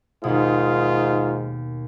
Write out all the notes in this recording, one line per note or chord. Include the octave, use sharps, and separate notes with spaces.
D#2 G#2 B2 D#4 F4 D#6